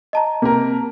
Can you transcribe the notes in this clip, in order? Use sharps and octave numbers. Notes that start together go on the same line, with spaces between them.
D#5 A5 A#5
C3 A#3 A#4